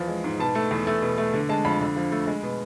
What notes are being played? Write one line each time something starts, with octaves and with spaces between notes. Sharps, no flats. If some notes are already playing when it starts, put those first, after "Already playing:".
Already playing: E2 F3
G#3
G#2
B2 A5
A3
E2
A3
B2
A3
D3
G#3 A5
F2 B5
D3
F3
A3
G#3
B2